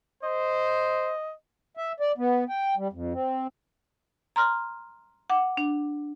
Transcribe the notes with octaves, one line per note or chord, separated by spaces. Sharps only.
C5 D#5
E5
D5
B3
G5
G3
F2
C4
A#5 C6 F6
F#5 D6
D4